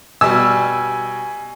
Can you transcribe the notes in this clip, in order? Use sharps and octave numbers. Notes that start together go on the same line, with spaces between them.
B2 G3 G#5 E6